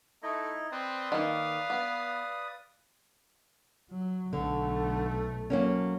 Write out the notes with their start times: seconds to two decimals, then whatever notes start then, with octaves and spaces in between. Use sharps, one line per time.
0.23 A3 D#4 E4 D#5
0.72 C4 B4 D5 D#6
1.12 D#3 A#3 F5
1.70 B3
3.91 F#3
4.33 B1 D3 A3
5.50 F#3 A#3 C#4